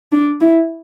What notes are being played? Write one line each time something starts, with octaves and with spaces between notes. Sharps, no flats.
D4
E4